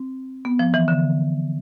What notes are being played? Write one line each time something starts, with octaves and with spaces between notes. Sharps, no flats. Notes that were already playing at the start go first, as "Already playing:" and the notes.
Already playing: C4
B3
F3
E3
D3